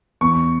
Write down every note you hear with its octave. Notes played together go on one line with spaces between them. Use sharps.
E2 C#6